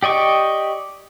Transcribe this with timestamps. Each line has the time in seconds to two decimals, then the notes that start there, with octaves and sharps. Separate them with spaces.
0.03 G4 D5 D#5 C#6